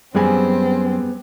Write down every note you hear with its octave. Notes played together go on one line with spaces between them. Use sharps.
F#2 G3 B3 C4 G#4 G#5 B5